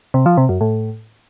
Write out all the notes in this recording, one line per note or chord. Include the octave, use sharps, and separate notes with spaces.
C3
F3
C3
F#2
A2